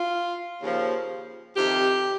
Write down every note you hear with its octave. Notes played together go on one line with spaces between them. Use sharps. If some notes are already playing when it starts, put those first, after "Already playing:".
Already playing: F4
D#2 C#3 F3
F2 C3 D#3 G4